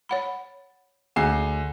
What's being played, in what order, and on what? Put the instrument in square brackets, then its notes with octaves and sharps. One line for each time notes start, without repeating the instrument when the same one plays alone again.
[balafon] C#5 F#5 B5
[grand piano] D2 G#5 C7 [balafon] G#4